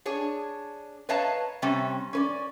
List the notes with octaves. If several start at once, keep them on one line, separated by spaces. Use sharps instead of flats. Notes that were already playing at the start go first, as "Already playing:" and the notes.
D4 G#4 C#5
B4 C#5 D#5 F5 A5 A#5
C3 G3 C4 C#4
C#4 B4 D5